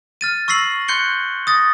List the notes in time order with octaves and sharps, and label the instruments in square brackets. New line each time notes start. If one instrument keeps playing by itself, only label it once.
[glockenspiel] F6 A6 D#7
C#6 E6 A#6 C7 F#7
C6 F#6 G6 C#7 G7
D#6 A6 A#6